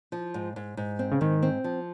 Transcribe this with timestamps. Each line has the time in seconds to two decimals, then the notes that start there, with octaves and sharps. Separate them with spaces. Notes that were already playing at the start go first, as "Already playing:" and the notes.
0.12 F3
0.34 G#2
0.56 G#2
0.77 G#2
0.99 C4
1.12 C#3
1.21 G#2 D#3
1.42 C4
1.64 F3